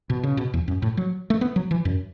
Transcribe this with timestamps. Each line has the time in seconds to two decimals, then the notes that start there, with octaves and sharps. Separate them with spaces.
0.10 B2
0.23 C#3
0.37 B2
0.54 E2
0.68 F#2
0.82 A2
0.97 F#3
1.30 A3
1.41 B3
1.56 F#3
1.71 E3
1.85 F#2